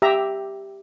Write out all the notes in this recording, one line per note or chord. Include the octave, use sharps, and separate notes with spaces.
G4 E5 A#5